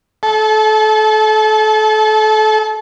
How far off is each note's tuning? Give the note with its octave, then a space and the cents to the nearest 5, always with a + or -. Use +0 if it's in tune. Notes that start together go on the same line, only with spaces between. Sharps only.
A4 -30